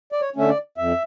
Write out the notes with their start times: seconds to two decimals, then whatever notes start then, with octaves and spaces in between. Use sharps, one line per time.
0.12 D5
0.21 C#5
0.36 D3 A3 C#4 E5
0.49 D5
0.77 F2 E5